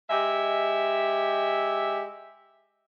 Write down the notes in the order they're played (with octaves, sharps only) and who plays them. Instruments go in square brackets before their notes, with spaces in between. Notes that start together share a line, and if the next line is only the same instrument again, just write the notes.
[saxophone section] G#3 G4 E5